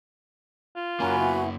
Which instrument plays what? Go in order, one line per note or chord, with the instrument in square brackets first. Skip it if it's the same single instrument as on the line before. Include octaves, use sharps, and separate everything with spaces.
[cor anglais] F4
[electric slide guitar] F#2 A#3 [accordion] C#4 A#4 [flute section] F#4 G#5 B5
[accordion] B3 E4